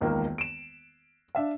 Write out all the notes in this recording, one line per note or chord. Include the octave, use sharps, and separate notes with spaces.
E1 C#2 D#3 A#3
D7 E7
D4 E5 F5